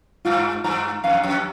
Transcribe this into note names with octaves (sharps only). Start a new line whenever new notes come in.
G2 F4
G2 A#5
F2 F5
F2